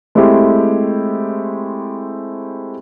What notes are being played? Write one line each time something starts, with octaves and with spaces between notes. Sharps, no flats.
G#3 A3 C4 E4 G4